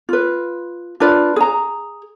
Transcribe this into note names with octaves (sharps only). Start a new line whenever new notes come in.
F4 B4
D4 F4 B4 D5
G#4 A#5